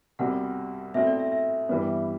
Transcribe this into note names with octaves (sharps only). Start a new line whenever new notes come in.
C2 B2 G3 C4 F#5
B2 A3 C4 E4 E5
D5
E5
E5
G2 E3 G3 B3